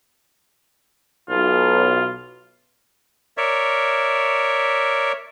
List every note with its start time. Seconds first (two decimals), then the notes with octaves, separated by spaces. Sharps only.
1.29 B1 F4
3.37 A#4 C#5 D5 E5